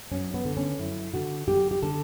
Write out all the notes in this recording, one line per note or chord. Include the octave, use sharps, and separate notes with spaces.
F#2 C#4
B3
D3
C#4
F#2 E4
D3 F#4
F#2 G4
G4
D3 A4